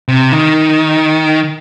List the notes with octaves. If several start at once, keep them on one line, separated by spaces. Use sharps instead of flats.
C3
D#3